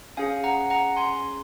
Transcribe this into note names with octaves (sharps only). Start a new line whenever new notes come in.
C#4 G#4 F5 G#5
F#5 A#5
F#5 A#5
G#5 C6